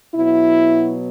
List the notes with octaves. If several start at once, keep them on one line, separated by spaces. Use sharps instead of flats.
B2 F#3 B3 E4